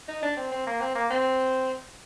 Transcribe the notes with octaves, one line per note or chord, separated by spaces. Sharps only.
D#4
D4
C4
C4
A#3
C4
A#3
C4